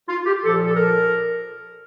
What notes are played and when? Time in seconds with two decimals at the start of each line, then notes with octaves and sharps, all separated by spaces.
0.08 F4
0.26 G4
0.42 A#2 F3 A4
0.65 A4
0.75 A#4